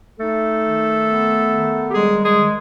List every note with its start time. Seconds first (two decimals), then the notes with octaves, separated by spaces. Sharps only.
0.19 A3 D#4 A4
0.64 D#3
1.07 B3
1.51 D#3
1.90 G4
1.94 G3 G#3 G#4
2.23 G#3 G#4
2.38 D#3